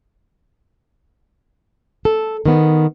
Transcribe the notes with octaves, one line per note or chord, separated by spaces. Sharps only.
A4
D#3 B3